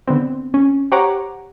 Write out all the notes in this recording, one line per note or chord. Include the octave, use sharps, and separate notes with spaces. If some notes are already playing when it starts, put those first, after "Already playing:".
D3 B3 C4
C#4
G4 C5 C#5 F#5 A#5 D6